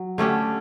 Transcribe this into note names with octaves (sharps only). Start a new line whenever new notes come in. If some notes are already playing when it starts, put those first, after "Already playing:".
Already playing: F#3
D3 A3 C#4 G4